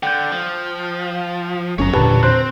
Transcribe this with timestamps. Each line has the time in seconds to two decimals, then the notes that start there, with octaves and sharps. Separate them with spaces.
0.03 D3 G5 G6
0.32 F3
1.79 G1 F#2 C#4 C#5 A#5
1.94 E1 A#2 D3 G4 B4 A5
2.23 C4 C5 F#6